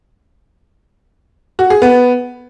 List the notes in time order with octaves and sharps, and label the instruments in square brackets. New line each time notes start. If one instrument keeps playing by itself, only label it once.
[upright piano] F#4
G#4
B3